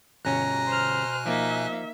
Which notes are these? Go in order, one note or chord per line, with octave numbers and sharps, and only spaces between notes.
G1 B2 C#4 C#5 G#5 A#5 F#6
C5 F6
F3 A#3 D#4 E5